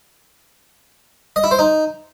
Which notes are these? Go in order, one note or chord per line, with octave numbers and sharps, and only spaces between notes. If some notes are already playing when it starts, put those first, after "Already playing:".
D#5
E4
C5
D#4